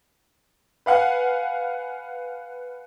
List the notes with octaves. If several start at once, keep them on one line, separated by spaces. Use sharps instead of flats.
B4 F5 F#5 G#5